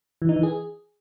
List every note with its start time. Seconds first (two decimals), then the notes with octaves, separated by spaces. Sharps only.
0.22 E3
0.29 D#4
0.36 E3
0.43 G#4